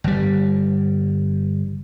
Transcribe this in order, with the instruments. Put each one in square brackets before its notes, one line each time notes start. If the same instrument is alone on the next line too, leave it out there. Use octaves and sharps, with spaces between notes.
[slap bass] G1 G3